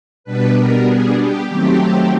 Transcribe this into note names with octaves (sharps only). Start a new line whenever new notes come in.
B2 G3 B3 D4 B4
A#4
G#4
G4
D#3 F#3 A3 C4 G4